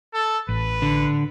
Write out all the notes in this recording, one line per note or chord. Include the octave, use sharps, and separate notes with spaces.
A4
A1 B4
D3